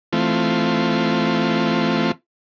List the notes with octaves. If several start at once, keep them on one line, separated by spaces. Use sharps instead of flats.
E3 A3 C4 F4